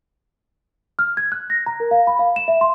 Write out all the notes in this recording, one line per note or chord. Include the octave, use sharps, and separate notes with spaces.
F6
G#6
F#6
A#6
A#5
A#4
F5
B5
F5
E7
E5
C6